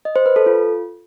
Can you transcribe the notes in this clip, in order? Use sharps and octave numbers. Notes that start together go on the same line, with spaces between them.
D#5
C5
B4
A4
F4